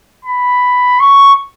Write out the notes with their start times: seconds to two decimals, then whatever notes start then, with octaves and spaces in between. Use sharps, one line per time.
0.25 B5
1.00 C#6